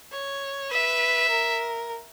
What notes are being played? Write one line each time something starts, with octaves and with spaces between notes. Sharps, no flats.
C#5
B4 E5
A#4